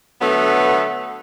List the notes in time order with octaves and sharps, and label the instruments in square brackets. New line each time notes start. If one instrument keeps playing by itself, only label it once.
[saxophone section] D3 F#3 A3 B3